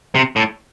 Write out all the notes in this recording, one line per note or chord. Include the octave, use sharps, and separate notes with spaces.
C3
A2